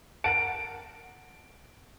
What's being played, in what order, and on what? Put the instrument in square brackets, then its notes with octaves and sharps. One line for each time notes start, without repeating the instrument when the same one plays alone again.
[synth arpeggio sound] A#4 F#5 A5 [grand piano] D7